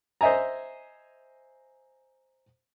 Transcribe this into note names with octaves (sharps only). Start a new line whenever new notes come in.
C5 D#5 E5 G#5 A#5